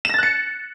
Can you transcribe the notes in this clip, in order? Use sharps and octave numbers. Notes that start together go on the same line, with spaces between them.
F#6 A6 A#6 C#7 E7